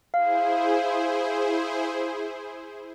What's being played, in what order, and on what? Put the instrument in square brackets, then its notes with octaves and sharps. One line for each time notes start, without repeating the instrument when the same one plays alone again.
[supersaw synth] E4 G#4 C5 [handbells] F5